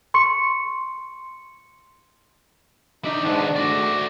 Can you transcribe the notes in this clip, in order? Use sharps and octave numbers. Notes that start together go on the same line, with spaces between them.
C6 C#6 C#7
D4 D#4 E5
G#2 D#3 B3 D4
A3 F#4 D5